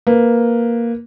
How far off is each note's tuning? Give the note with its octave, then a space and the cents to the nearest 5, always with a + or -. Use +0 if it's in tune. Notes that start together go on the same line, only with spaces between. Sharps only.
A#3 +0 B4 +0